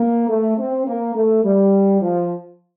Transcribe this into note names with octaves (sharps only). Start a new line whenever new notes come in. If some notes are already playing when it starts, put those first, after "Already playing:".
Already playing: A#3
A3
C4
A#3
A3
G3
F3